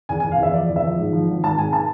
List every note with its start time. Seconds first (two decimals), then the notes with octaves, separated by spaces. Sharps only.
0.09 E2 G#5
0.20 G#5
0.24 E2
0.31 F5
0.39 E2 E5
0.54 F3 D5
0.69 E2
0.76 E5
0.83 F3
0.99 G#2
1.13 F3
1.29 G#1
1.43 G#1 A5
1.57 G#2 G#5
1.73 A5